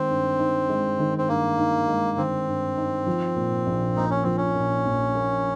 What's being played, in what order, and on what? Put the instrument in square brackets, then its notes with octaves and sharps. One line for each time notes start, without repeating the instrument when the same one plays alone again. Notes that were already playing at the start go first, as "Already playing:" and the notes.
Already playing: [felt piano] D#3 G#3 [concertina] C4
[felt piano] G2
D#4
G#3
D#3
[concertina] C4
[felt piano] G2 [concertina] A#3
[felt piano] D#4
G#3
[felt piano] D#3 [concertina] C4
[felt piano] G2
D#4
F3
A#2
A#1
[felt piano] A#3 [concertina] D#4
[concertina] C#4
[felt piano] F3 [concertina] C4
[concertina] C#4
[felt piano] A#2
A#1
A#3